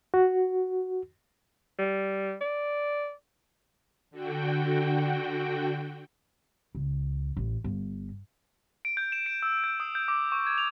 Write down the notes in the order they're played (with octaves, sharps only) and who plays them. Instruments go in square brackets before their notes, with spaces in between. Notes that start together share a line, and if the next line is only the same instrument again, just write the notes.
[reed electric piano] F#4
[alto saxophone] G3
D5
[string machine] D3 F#4 G5
[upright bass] C#2
A1
G1
[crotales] D7
G6
E7
D7
E6
G6
D#6
G6
D6
C#6
G#6
F7